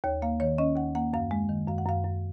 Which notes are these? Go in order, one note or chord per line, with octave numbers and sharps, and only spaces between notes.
D#2 C#5
A#3 F5
D#3 C#5
C#4 D#5
D#2 F#5
A#3 F#5
F#2 F5
G#3
D#3
F#2 F5
F#5
F#2 F5
F#2